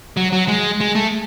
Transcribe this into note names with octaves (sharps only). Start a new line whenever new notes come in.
F#3
F#3
G#3
G#3
A3